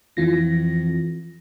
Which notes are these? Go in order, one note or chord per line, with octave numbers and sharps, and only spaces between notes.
F2 E3 F4 A#6